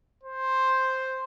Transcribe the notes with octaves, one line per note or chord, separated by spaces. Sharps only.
C5